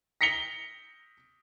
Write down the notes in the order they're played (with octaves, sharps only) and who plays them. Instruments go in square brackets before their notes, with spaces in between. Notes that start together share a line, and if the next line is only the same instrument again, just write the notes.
[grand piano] A#6 B6 C#7 F7 G7